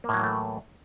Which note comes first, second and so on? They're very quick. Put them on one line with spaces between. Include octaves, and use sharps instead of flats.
A#3 A2 F#3 E3 A3